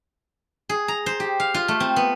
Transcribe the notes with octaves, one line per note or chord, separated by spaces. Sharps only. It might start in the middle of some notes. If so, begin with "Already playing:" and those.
G#4
A#5
C5
G4
F5
F4
A3
C4
B3